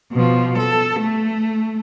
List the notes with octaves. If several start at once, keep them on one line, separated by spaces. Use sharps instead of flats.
B2 F3
A4
A3